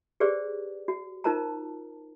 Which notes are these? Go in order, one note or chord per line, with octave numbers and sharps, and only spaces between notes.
G4 G#4 B4 C5 D5
F#4
D#4 F4 A#4 C5 A5 A#5